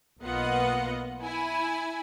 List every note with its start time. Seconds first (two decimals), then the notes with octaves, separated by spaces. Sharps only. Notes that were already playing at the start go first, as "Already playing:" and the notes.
0.22 B1 A#3 B3 F4 D#5 F#5
1.22 E4 G#5